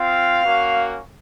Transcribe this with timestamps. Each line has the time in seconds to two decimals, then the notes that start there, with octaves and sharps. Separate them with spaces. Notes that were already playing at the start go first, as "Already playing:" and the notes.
Already playing: C4 F4 F5
0.45 A#3 C#4 F#4